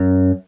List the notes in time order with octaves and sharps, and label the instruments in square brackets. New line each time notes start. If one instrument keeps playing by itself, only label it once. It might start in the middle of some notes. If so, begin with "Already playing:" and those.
Already playing: [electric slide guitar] F#2